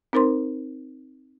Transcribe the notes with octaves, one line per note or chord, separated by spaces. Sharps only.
C4 D#4 A#4 C5 C6